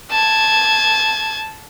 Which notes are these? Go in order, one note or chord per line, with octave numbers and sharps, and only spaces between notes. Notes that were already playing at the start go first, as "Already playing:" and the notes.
A5 G#6